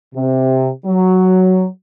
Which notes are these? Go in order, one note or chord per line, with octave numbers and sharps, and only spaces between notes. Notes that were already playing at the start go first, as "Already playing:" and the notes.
C3
F#3